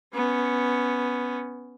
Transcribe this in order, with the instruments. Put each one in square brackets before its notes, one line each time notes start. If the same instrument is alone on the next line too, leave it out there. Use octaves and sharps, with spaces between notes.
[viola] B3 C#4